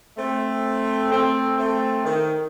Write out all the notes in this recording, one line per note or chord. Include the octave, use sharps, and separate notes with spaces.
A3 C4
A3 C4
A3 C4
D#3